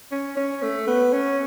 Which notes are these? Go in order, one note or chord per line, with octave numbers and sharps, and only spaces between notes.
C#4
C#4
A3
B3
C#4